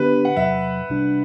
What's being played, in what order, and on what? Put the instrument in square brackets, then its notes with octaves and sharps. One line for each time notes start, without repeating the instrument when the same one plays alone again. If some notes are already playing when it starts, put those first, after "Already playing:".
Already playing: [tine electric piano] D3 B3 D4 G4 [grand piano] B4
[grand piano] F#5
[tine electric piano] E2 C3 F#3 [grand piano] E5
[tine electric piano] C2 C3 G3 D4